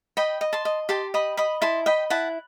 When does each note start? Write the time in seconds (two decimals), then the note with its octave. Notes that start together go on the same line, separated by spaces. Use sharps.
0.17 D#5 G5 B5
0.41 D#5
0.53 A5 C6
0.65 D#5
0.89 G4 A5 C6
1.14 D#5 B5 D#6
1.37 D#5 B5 D#6
1.62 E4 A5 C6
1.86 D#5 G5 B5
2.10 E4 F#5 A5